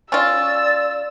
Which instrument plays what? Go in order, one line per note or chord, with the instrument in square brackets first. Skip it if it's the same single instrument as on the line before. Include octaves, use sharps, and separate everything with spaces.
[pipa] C#4 F4 [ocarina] D5 [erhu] E6 [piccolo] A6